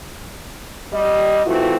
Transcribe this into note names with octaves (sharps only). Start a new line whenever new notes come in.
G3 D#5
E3 A3 C4 F4 F#4